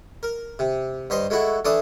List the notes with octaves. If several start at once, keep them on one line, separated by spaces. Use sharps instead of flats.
A#4
C3
G2 C5 D#5 C6
G#3 A3 E4 F#4
E3 A3 D4 D6 D#6